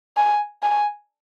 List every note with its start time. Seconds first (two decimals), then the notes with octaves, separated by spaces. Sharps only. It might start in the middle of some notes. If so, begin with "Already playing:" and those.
0.17 G#5
0.63 G#5